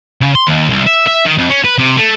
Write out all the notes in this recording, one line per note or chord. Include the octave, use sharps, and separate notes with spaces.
C#3
C6
D#2
C2
E5
E5
D#3
F2
C#4
B4
C3
A3